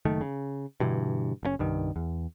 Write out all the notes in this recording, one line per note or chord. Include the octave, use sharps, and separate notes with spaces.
F#1 D#3 A3
C#3
G2 B2 D3 E3
F#1 A2 C#4
C2 G2 D#3
E2